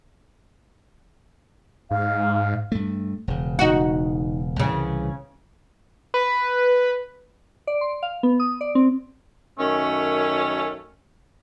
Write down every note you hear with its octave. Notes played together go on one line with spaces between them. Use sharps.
G#2 F5
G2 A3
E1 C#3
D#4 F#4
C2 C#3 E3
B4
D5
C6
F5
B3
D#6
D5
C4
F#2 D#3 A3 C#4